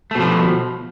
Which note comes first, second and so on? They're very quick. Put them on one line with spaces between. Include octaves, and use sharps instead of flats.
A3 B2 F3